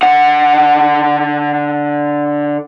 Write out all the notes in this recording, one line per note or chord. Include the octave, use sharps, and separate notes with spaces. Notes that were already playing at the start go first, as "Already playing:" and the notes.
D3 F#5